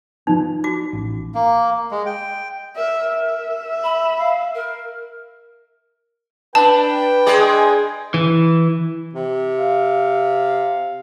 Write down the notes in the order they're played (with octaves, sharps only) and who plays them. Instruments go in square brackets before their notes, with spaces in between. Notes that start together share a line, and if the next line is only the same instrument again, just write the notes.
[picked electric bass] F3 B3 [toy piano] D#4
[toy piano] F#4 D6
[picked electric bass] A1
[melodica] A#3
G#3
G5
[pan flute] A#4 [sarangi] E5
[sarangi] E5
[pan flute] B5
F5
A#4
[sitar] D4 [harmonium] B4 [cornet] G5 [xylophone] A5
[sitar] G#3 G#4 D5
[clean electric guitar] E3
[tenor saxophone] C3
[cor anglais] F5